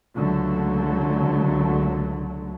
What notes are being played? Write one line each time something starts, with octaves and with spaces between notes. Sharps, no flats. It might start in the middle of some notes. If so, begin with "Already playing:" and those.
C#2 D3 F#3 A3